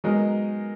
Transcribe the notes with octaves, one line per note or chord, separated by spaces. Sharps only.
F#3 G#3 B3 D#4 A#4